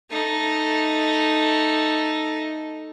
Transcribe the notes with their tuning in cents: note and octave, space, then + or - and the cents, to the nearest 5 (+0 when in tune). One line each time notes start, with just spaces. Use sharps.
A3 +0 D#4 +0